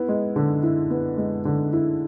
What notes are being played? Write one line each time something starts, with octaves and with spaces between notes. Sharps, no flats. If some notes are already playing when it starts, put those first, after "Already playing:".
Already playing: B3 E4
G#3
D3
E4
B3
G#3
D3
E4